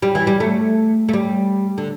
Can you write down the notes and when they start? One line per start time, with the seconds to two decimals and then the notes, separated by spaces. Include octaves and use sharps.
0.02 G3
0.15 E3
0.27 G3
0.40 A3
1.09 A3
1.13 G3
1.78 D3